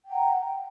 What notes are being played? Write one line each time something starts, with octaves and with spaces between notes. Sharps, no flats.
F#5 G5 A#5